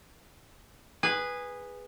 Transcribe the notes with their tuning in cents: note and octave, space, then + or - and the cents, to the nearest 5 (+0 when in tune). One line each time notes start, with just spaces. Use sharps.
G#4 -15 B4 +0